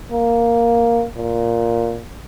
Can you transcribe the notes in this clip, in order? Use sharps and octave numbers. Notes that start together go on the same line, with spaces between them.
A#3
A#2